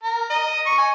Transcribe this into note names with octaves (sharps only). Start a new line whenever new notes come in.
A#4
D#5
C#6
G#5